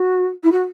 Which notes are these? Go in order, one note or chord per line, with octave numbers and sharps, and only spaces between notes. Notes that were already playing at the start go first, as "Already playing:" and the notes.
Already playing: F#4
E4
F#4